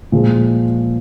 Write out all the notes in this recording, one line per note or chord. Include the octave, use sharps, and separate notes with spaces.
A#2 F3 G#3